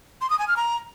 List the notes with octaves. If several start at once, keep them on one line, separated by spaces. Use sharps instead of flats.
C6
D#6
G#5
F6
A#5